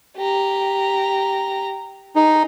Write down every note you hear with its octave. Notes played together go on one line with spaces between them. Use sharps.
G4 A#5
D#4 G#4